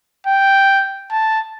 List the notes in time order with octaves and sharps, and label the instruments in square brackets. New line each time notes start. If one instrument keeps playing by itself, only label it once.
[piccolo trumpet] G5
A5